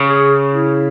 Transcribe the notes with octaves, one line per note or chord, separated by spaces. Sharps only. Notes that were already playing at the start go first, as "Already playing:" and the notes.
Already playing: C#3
G#4
E4